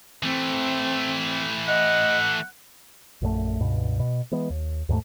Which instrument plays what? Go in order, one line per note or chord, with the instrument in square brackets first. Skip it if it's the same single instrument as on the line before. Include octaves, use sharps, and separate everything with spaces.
[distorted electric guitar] E3 A3 [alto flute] C4
[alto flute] D#5 [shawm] F#5
[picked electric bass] A#1 F#2 F3 A3
C#2 G2 B2
B2
E3 G#3 B3
D#2
D#2 G#2 G#3 A3